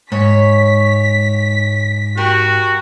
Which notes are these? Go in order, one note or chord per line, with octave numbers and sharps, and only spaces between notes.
G#2 C#5 B6
F#4 G4 A#4